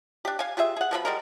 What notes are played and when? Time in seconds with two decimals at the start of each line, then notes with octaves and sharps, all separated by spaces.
0.25 D4 G4
0.39 F5 G#5
0.57 F4 G4 G#4 E5
0.76 G#4 F#5
0.91 B2 F3 C#4 B5
1.05 G3 G#3 A#4